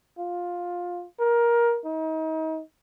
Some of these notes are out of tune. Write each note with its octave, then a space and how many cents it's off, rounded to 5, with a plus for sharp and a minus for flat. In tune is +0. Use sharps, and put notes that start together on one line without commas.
F4 +15
A#4 +15
D#4 +35